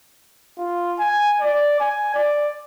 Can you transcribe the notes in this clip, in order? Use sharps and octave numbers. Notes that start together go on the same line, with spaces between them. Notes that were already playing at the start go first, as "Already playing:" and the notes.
F4
G#5
D5
G#5
D5